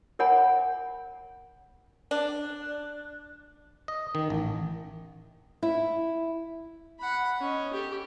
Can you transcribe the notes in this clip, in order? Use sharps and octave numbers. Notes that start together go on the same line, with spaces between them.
A#4 C#5 F#5 G#5 B5
D4
D#5
D#3
A1
E4
F#5 B5
C#4 D#5
G4 A4